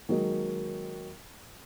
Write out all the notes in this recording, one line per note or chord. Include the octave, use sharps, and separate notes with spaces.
D#3 F#3 G#3 A#3 A#4 D#5